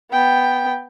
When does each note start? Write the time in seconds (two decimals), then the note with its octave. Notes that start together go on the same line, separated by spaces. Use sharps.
0.11 B3 G5